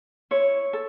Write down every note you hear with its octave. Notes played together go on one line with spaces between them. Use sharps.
E4 C#5
A4